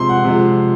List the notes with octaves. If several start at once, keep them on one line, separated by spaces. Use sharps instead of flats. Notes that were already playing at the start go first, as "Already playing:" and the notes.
Already playing: C3 F3 G#3 C6
F#5
C3 F3 G#3